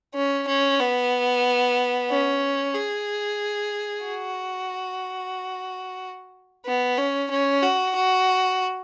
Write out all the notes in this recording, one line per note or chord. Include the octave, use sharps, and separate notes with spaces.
C#4
C#4
B3
C#4
G#4
F#4
B3
C#4
C#4
F#4
F#4